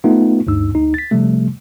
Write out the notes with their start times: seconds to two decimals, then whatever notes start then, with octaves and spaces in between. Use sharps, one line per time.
0.04 A3 B3 D#4 F4
0.47 D2 G2 D#4 E6
0.74 D2 D#4
0.94 A6 B6
1.11 C3 F3 G3 A3